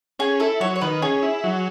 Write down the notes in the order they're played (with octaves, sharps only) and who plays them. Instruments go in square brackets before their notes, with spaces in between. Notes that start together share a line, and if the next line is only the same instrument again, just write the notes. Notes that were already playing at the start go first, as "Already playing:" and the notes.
[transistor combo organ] C#4 [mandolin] G#4
[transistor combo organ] E4 [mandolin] A4
[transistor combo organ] F#3 [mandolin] C#5
[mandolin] C#5
[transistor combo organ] D#3 [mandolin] B4
[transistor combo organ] C#4 [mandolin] G#4
[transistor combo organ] E4
F#3